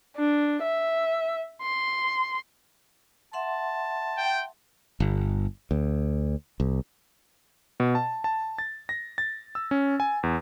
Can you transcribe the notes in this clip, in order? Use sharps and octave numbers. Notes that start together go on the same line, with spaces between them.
D4
E5
C6
E5 F#5 A5 C6
G5
G1
D2
C2
B2
A5
A5
A6
A#6
A6
E6
C#4
G#5
E2